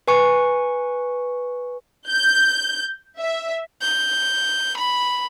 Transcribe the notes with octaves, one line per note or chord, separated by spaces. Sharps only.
B4 G#5 C#6 C#7
G6
E5
G6
B5